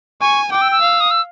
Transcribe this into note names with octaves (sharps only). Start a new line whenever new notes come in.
G#5 C#6
G5 D6
E6
E6
F5
D#6
E6